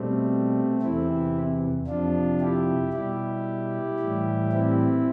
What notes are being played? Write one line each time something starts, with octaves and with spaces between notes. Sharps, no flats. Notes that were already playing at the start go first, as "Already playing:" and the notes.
Already playing: B2 G3 A3 C4
E2 C3 E3 C4 E4
F2 C3 F3 D4 F4
E4 G4
B2 G3 E4 G4
A2 E3 G3
C4 E4